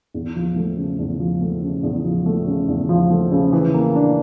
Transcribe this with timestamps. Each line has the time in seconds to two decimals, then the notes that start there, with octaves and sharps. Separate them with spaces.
0.14 E2
0.36 F3
0.56 A3
0.77 C#3
0.99 E2
1.19 F3
1.41 A3
1.63 C#3
1.83 E2
2.04 F3
2.26 A3
2.47 C#3
2.68 E2
2.89 F3
3.10 A3
3.31 C#3
3.53 E3
3.74 A#3
3.95 D4